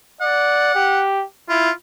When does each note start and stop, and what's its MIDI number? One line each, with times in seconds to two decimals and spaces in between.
0.21 0.74 74
0.21 1.00 78
0.75 1.24 67
1.49 1.70 64
1.49 1.71 65